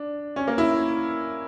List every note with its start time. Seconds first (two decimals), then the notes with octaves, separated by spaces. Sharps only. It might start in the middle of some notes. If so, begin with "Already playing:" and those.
Already playing: D4
0.36 C#4
0.47 A#3
0.58 E4